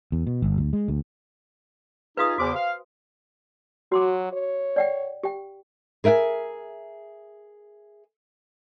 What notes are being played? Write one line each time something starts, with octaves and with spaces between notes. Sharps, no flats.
E2
B2
G1
D2
G#3
D2
D#4 F4 G#4 B4 F5 D#6
E2 C#3 F#4 C5 G#5 D6
F5
F#3 F#4 C6 D6
C#5
D5 F#5 G5
G4 G5
G#4 A#4 E5 F#5 G#5